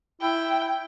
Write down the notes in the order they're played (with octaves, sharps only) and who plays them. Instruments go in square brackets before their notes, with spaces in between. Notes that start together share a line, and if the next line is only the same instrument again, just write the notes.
[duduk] E4 [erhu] G5